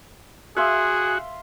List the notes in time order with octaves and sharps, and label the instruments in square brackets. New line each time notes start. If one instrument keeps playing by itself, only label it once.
[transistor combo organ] F#4 [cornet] G#4 [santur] E5 F5 C6